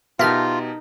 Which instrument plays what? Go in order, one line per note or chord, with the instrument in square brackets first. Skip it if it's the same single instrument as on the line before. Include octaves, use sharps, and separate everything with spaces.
[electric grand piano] B2 G4 A5 [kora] D#4 A#4 [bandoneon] F4 [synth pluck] E5 F6